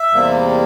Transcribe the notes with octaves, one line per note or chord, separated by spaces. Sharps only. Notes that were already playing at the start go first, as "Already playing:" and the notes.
Already playing: E5
E2 C3 G3 A#3